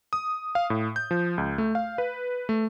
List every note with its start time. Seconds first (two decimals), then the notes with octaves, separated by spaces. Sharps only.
0.13 D#6
0.55 F5
0.70 A2
0.96 G6
1.11 F3
1.38 C#2
1.58 A3
1.75 F5
1.98 B4
2.49 A3